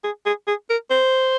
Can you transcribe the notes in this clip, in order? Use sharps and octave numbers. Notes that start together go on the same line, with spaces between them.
G#4
G#4
G#4
A#4
C5